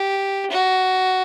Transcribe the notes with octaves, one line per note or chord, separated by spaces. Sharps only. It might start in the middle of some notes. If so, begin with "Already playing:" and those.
Already playing: G4
F#4